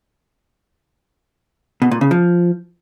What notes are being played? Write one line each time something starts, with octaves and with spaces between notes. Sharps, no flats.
B2
A#2
C#3
F3